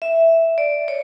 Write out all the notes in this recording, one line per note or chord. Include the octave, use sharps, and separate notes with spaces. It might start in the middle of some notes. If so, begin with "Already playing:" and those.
E5
D5
C#5